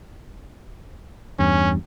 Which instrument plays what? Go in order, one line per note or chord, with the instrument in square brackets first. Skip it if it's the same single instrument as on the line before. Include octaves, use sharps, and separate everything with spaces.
[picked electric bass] E2 G2 [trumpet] C#4